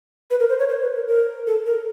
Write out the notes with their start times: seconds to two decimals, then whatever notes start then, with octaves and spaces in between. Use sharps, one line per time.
0.31 B4
0.40 A#4
0.50 C5
0.59 C#5
0.69 C5
0.82 B4
0.95 A#4
1.08 A#4
1.47 A4
1.66 A#4